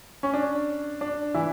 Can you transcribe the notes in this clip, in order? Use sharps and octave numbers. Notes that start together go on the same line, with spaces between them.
C#4
D4
D4
E3 E4